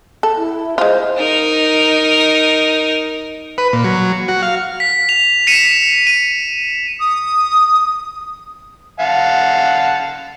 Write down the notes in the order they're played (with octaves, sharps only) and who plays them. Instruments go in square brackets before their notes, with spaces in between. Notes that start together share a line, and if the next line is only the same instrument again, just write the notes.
[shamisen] A4
[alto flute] E4
[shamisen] G#3 F4 [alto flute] C5
[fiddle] D#4 A#4
[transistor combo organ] B4
A#2
F#3
F#4
F5
[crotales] B6
F7
B6 C#7 D#7 E7
D#7
[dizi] D#6
[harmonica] F5 F#5 A5